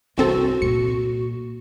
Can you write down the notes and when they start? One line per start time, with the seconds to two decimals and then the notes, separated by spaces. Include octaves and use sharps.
0.18 C2 E3 C4 F#4 A4
0.62 A#2 C#7